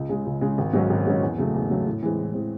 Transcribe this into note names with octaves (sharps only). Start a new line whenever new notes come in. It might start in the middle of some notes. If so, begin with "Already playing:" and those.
Already playing: C#2
C#3 G#3
C#2
C#3 G#3
G#1
G#2 F#3 C#4
G#1
G#2 F#3 C#4
E2
C#3 F#3 A3
E2
C#3 F#3 A3
A2
E3 G#3 C4
A2
E3 G#3 C4